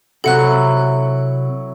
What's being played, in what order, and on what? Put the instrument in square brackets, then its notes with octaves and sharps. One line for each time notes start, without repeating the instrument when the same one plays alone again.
[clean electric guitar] C3 F#4 [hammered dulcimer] F#3 E4 [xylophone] A4 F#5 F#6